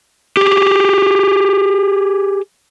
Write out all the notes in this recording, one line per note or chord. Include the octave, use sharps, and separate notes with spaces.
G4 G#4